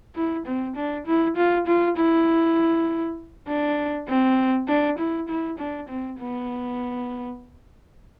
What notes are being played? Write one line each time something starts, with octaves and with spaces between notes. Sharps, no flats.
E4
C4
D4
E4
F4
F4
E4
D4
C4
D4
E4
E4
D4
C4
B3